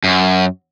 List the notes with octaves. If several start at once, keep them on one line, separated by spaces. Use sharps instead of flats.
F#2